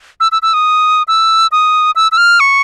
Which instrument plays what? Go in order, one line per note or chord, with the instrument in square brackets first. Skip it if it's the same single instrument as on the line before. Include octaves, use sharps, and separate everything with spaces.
[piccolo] E6
E6
E6
D#6
E6
D#6
E6
E6
F6
C#6